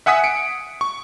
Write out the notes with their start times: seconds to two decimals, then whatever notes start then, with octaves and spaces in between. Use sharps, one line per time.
0.06 E5 F#5 G#5 D#6 B6
0.24 C#7 D7
0.81 C#6